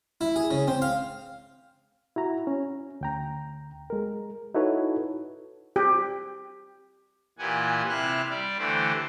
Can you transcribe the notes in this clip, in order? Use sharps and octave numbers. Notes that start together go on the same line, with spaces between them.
E4
G#4
C#3
C4
F5
E4 F#4 A#5
C#4
D2 G5 A#5
G#3 A#4
D#4 E4 F#4 A4 B4 C#5
G4
A#2 E3 G4 F#5 G#5
C3 E4 F6 F#6
G3 D5
D3 E3 A3 G4 C5